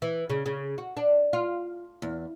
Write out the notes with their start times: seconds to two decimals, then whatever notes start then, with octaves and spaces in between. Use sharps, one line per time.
0.02 E3
0.30 C#3
0.46 C#3
0.78 F#4
0.97 D4
1.33 F4
2.02 E2